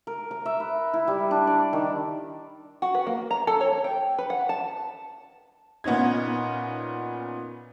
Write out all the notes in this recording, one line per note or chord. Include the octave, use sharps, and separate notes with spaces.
A#4
A#5
E5
B4
E4
G3
D4
D5
D#3
F#4
B4
A#3
A#5
A4
C#5
G5
B4
F#5
A5
A#2 B3 C#4 D#4 G#6